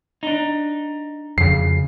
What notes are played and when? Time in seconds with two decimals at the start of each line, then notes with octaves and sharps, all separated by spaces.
0.23 D4 D#4
1.38 F2 C#3 C7